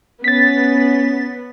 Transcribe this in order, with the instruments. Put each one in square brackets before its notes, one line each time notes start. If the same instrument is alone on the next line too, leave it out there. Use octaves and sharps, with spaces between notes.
[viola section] B3 [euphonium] C#4 [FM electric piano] A6 B6